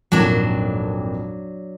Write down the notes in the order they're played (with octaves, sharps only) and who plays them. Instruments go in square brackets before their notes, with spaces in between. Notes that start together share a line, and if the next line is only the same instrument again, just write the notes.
[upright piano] G#1 F2 A#2 [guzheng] F#3 D4